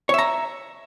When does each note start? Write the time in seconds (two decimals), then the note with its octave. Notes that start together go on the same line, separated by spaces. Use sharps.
0.09 C#5
0.14 E5
0.18 A#5